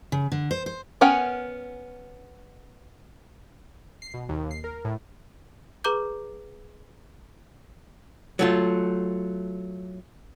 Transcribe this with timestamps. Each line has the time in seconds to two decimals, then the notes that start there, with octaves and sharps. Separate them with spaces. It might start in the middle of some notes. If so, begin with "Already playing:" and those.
0.12 C#3
0.32 D3
0.51 C5
0.66 C5
1.01 B3 C#4 A#4 F#5 G#5
4.02 C7
4.14 B2
4.29 D#2
4.51 C7
4.64 A#4
4.85 A2
5.84 G#4 B4 A#5 D6 G6
8.39 F#3 A3 F4